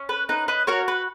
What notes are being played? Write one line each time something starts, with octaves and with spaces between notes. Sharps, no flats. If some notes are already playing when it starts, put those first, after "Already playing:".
Already playing: C#4
B4
D#4 B4
B4 D#5
F#4 A#4 C#5
B4